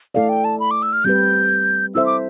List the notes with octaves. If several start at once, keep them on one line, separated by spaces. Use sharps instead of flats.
A3 E4 A4 D5 F5
G5
A5
B5
D6
E6
F6
G3 C4 G4 B4 G6
C4 E4 A4 C5 E5 E6
D6